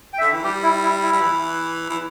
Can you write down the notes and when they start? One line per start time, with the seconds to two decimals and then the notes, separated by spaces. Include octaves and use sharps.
0.13 G5
0.18 E5
0.21 D3
0.32 E3
0.43 G3 G4
0.63 E4
0.83 E4
1.02 E4
1.12 G3
1.21 E3
1.89 E3